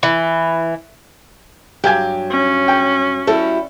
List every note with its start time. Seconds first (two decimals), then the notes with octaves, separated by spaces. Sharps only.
0.03 E3
1.84 G2 F#3 G4 G5 G#5
2.30 C#4
2.68 G5
3.27 G3 E4 F#4 A4